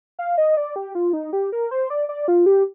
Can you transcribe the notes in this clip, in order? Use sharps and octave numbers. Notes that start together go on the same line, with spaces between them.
F5
D#5
D5
G4
F4
D#4
G4
A#4
C5
D5
D5
F4
G4